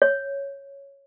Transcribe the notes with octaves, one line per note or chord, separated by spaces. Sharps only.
C#5